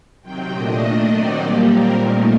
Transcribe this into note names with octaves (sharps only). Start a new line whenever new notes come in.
C3 D#3 F#3 C4 G5
A#2 A3 D4 D#5
D#3 A3 D4 D#5
D#3 F#3 C4 D#4 D5
A#2 G3 A#3 G4
A#2 G3 C4 A#4
A#2 A3 D#4